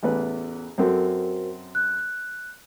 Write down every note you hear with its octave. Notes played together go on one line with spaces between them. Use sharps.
A1 E2 B4
F#2 C4 F#4 A4 A#4 C5
F#6